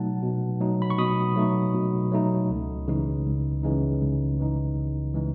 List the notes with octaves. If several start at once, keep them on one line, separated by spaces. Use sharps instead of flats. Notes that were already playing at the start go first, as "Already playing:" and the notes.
Already playing: B2 F#3 A3 D#4 F#5 A5
B2
F#3 A3 D#4
B5
C#6
B2 B5 D#6
F#3 A3 D#4
B2
F#3 A3 D#4
C#2
C#3 E3 G#3 D#4
C#2
C#3 E3 G#3 D#4
C#2
C#3 E3 G#3 D#4
C#2
C#3 E3 G#3 D#4